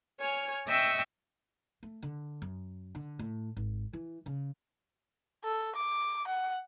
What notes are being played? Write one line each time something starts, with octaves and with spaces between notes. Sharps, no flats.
C#5 G#5 F6
D#5 E5 G5 C#6 E6
A3
D3
F#2
D3
A2
G#1
E3
C#3
A4
D6
F#5